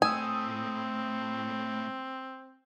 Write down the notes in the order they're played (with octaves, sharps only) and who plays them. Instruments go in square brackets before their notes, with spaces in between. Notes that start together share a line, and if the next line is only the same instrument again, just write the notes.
[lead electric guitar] A2 A3 [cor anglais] C4 [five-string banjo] G#5 [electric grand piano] D#6 E6